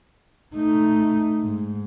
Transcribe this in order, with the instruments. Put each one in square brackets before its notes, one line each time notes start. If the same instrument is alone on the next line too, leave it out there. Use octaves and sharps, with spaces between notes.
[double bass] A3 D#4
G#2